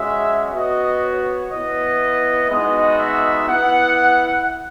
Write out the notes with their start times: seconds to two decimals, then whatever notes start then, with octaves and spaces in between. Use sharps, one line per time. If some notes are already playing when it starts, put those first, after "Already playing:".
Already playing: G#3 C#4 F#4 E5
0.52 B3 F#4 D#5
1.02 C#5
1.51 B3 E4 D#5
2.49 G#3 B3 D#4 F#4 D#5
2.98 E5
3.47 B3 E4 F#5